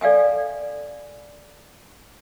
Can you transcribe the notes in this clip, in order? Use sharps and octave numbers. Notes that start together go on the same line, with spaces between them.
A4 D5 F5 G5 G#5